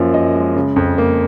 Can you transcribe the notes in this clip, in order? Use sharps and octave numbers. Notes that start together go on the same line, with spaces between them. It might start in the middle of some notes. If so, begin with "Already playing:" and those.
Already playing: F#2 F3 A#3
F#2 D#5
G#3
C#3
F2
A#3